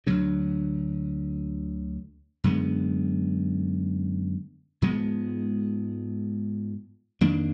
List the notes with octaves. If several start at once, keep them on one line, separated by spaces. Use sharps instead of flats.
D2 D3 F#3 D4
F#2 D3 G#3 B3
G#2 F3 G#3 B3
F2 D#3 A#3 D4